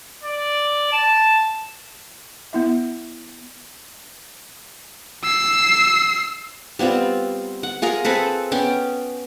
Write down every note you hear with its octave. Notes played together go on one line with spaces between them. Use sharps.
D5
A5
B3 E4 E5
E6 C7
G3 B3 C4 F4
F#5
F4 G#4 A#4 A#5
C4 G#4 A4 B4
B3 C#4 G5